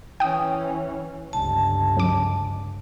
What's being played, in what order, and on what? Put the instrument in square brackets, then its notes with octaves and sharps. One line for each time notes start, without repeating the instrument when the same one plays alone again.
[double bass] E3 C#4 [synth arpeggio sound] G5 D#6
[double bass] G1 C#2 [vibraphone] A5
[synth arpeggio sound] F#2 D6